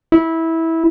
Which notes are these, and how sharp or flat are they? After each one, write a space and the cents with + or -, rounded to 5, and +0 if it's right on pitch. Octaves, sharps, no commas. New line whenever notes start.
E4 -15